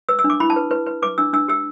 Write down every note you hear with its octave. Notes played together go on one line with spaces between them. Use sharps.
B4 E6
E6
D4
D6
E4 B5
A5
B4
B4
B4
B4 D6
D4 E6
D4 E6
G4 E6